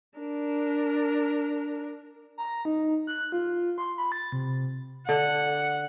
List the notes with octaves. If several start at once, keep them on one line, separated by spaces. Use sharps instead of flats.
D4 A#4
A#5
D#4
F#6
F4
C6
B5
A6
C3
D3 F#5